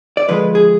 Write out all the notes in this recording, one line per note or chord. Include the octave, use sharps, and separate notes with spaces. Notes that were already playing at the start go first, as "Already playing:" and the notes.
D5
D3 F3 G#3 B4
G#4